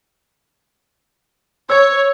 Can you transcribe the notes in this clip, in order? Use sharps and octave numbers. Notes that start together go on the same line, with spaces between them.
C#5 E6 G#6